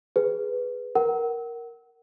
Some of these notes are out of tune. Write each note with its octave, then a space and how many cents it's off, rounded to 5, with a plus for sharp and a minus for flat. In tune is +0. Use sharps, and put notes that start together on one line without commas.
G#4 +0 B4 +0
A#4 +0 F#5 +30